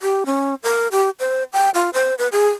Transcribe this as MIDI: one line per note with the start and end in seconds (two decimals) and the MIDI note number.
0.01 0.24 67
0.26 0.55 61
0.63 0.88 70
0.92 1.10 67
1.20 1.43 72
1.53 1.70 79
1.74 1.90 65
1.93 2.14 72
2.18 2.28 71
2.32 2.49 68